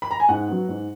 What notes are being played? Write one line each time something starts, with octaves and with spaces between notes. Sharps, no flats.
B5
A#5
G#5
G#2 F#5
F#3 B3
G#2